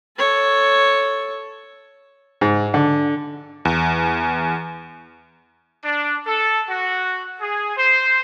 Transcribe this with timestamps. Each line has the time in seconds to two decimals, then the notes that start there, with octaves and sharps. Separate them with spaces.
0.18 A4 C#5
2.41 G#2
2.74 D3
3.65 E2
5.84 D4
6.27 A4
6.70 F#4
7.42 G#4
7.77 C5